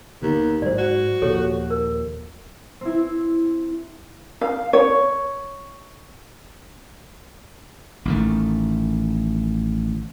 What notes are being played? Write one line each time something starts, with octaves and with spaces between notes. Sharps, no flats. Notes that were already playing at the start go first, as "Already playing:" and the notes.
D#2 D3 B3
G#2 F#3 C5 D5
F#4 D5
D#2 A#2 F3 G4 A4 C#5
A#4
C4 E4
F5
C#5
A1 D#3 A3